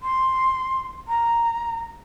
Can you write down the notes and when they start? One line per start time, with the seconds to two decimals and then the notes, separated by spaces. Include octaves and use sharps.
0.02 C6
1.08 A#5